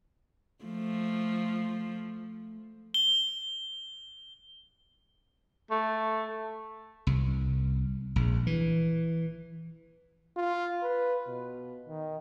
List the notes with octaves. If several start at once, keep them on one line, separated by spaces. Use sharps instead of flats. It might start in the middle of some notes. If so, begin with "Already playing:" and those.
F3 A3
G7
A3
C2
A#1
E3
F4
B4
B2
D#3